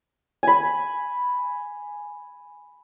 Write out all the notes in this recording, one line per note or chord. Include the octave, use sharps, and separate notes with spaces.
G#5 B5